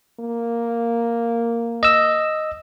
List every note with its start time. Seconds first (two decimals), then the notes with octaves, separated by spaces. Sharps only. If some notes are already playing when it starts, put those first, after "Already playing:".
0.20 A#3
1.83 D#5 E6